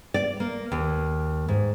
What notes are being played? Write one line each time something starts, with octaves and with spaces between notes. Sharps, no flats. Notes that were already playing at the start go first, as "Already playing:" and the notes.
D5
A#3
D#2
G#2